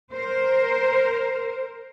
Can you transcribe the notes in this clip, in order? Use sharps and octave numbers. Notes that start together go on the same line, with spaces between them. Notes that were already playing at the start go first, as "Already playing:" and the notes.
A#4 C5